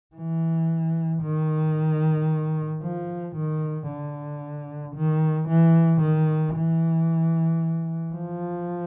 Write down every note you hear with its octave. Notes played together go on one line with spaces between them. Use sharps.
E3
D#3
F3
D#3
D3
D#3
E3
D#3
E3
F3